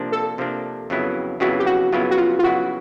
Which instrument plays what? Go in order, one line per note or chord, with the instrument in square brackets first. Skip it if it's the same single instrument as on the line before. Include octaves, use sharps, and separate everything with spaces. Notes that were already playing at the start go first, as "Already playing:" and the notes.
Already playing: [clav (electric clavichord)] C3 F3 A#3 D4
[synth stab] A4
[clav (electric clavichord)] C3 F3 A#3 D4
F2 C#3 F#3 B3 E4
[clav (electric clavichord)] F2 C#3 F#3 B3 E4 [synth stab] F#4
[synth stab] G4
F#4
[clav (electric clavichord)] F2 C#3 F#3 B3 E4 [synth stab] F4
[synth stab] F#4
F4
F4
[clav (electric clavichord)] F2 C#3 F#3 B3 E4 [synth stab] F#4